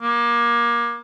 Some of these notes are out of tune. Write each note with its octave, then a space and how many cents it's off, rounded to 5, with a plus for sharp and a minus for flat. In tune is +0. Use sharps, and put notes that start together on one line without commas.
A#3 +25